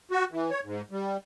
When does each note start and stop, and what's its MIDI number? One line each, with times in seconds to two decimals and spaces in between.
0.11 0.24 66
0.32 0.51 52
0.51 0.60 73
0.64 0.81 44
0.91 1.17 55